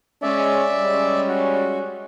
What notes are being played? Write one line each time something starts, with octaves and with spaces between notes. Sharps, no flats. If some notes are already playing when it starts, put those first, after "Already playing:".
G#3 C#4 D5 E5
G3 G#3 C#4
F#4